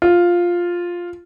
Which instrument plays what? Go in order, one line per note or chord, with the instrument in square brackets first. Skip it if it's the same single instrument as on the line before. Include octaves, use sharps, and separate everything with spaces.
[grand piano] F4